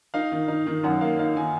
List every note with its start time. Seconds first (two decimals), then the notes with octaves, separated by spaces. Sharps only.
0.14 D#4 F5
0.32 D#3
0.48 D#4
0.67 D#3
0.84 F#2 F#5
1.01 A#3 F5
1.19 D#4 F5
1.36 D#3 G#5